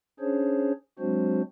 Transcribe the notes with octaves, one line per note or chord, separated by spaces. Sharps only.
C#4 D4 G#4 C5 C#5
F#3 G#3 C4 D4 F#4 C5